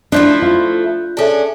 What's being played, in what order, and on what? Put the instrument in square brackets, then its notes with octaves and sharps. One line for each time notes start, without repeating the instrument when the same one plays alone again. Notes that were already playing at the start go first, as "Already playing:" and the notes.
[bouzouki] F3 A3 E4 [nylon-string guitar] D4 [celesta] F#6 G6
[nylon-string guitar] F4
[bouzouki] C#4 D4 [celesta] G#4 A4 E5